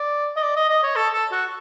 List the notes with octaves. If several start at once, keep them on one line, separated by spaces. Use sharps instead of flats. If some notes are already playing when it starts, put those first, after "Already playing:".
Already playing: D5
D#5
D5
D#5
D#5
C#5
A4
A4
F#4